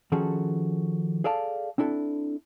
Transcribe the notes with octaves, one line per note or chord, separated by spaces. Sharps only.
D#3 F3 C#4 F#4 G#4 A4
G#4 A4 D5 F5 A5
C4 D4 E4 A4